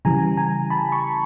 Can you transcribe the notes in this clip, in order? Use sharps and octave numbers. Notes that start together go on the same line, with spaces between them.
C#3 E3 G3 G#5 A#5
G#5 A#5
A5 B5
B5 C#6